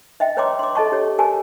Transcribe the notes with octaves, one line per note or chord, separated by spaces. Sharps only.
D#5 E5 G5
B4 C#5 G5 A#5 C6 D6
C6 D6
A4 D#5 A5 C#6
G4 C#5
G4 A#4 G#5 A5